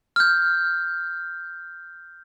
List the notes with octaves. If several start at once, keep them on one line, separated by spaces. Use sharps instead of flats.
F6 G6